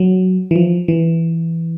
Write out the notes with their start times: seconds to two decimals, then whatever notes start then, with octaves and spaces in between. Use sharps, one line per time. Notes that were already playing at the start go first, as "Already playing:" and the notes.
Already playing: F#3
0.51 E3
0.56 F3
0.88 E3